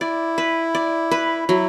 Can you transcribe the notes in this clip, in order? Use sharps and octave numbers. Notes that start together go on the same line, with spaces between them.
E4 D5
B4
D5
B4
F#3 E4